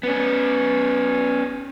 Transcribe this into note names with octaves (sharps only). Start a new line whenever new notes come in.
B3 C#4